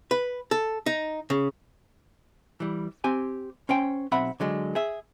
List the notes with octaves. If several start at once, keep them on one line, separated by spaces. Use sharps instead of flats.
B4
A4
D#4
C#3
E3 G3
C4 G4 G#5
C#4 C5 G5
B1 C4 E5 F#5 B5
D3 F#3 G#3
G#4 E5